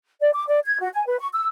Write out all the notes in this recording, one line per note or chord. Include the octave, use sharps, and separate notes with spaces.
D5
D6
D5
G#6
F#4
G#5
B4
C#6
E6